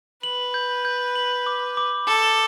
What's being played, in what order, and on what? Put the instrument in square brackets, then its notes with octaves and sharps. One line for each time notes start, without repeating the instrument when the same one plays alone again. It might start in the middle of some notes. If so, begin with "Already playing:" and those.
[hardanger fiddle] B4 [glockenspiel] F#7
[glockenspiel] G6
G6
F#7
D6
D6
[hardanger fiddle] A4 [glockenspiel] D6